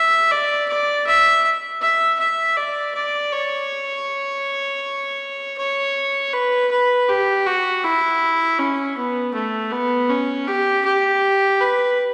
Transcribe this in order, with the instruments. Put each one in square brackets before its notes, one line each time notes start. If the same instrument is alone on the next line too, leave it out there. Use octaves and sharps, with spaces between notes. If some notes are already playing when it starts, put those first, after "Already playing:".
Already playing: [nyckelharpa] E5
D5
D5
E5
E5
E5
D5
D5
C#5
C#5
B4
B4
G4
F#4
E4
C#4
B3
A3
B3
C#4
G4
G4
B4